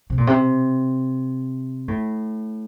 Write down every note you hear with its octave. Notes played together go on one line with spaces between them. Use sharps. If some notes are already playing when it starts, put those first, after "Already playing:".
C3
A#2
C3
A2